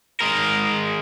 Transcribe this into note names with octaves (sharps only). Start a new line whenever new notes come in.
G#3 A#4